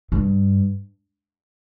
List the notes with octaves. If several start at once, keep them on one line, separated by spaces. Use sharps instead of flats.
G2